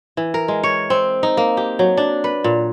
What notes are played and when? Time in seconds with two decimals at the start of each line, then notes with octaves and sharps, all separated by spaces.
0.17 E3
0.34 A#4
0.48 G#3
0.64 C#5
0.90 C4
1.23 D#4
1.37 A#3
1.57 G4
1.79 F#3
1.97 D4
2.24 B4
2.44 A#2